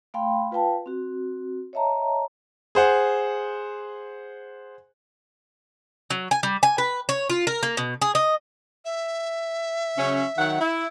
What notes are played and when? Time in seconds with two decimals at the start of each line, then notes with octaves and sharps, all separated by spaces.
0.14 A3 F5 G5 B5 C6
0.51 F4 B4 F5 G5 A5
0.86 C4 F#4
1.73 C#5 D#5 E5 A5 A#5
2.75 G#4 C5 F#5
6.10 F#3
6.31 G#5
6.43 G3
6.63 G#5
6.78 B4
7.09 C#5
7.30 F4
7.47 A#4
7.63 A#3
7.77 B2
8.02 G#4
8.15 D#5
8.85 E5
9.98 C#3 F#3 C#4
10.38 D#3 F#3 F#5
10.61 E4